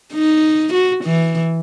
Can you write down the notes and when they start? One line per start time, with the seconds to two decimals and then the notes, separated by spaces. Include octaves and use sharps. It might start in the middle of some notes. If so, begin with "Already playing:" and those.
0.13 D#4
0.73 F#4
1.04 E3